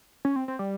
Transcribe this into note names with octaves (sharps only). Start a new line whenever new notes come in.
C#4
C4
C4
G3